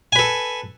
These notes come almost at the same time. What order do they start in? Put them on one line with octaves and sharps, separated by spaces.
G#5 B4 A4